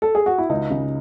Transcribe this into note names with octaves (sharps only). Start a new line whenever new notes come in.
A4
G#4
F#4
E4
C#2 D#4
C#3